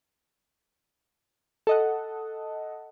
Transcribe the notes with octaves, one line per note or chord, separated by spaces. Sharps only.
A4 D#5 F#5